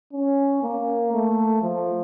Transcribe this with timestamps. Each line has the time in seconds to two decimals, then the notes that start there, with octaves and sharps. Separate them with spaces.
0.12 C#4
0.63 A#3
1.13 A3
1.62 F3